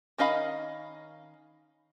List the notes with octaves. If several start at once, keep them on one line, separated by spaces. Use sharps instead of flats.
D#3 C#4 D#5 F5 B5